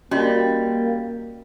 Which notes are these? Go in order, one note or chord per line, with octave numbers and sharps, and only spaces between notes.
G3 A#3 C#4 F#4 D#5